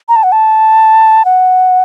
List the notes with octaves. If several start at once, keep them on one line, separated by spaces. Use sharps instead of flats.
A#5
A5
F#5
A5
F#5